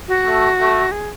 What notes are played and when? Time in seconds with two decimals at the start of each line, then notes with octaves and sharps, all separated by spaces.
0.08 F#4
0.24 A3
0.58 A3
0.92 G#4